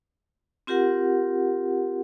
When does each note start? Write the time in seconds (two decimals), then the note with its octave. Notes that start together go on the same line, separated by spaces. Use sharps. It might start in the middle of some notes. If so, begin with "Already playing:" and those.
0.67 C4 F4 G4 A#4 F#5